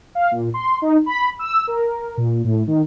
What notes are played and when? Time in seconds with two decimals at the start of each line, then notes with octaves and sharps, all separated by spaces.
0.15 F5
0.31 A#2
0.54 C6
0.82 D#4
1.06 B5
1.39 E6
1.67 A#4
2.17 A#2
2.44 A2
2.67 D#3